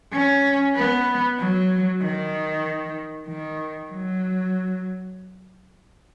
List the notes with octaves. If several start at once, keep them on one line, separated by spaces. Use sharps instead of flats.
C#4
B3
F#3
D#3
D#3
F#3